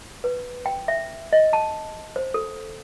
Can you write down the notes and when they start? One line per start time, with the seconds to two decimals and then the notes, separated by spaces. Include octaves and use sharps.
0.24 B4
0.66 G5
0.88 E5
1.33 D#5
1.53 A5
2.16 C5
2.34 A4